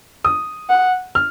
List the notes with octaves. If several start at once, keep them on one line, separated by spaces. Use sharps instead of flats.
D#6
F#5
F6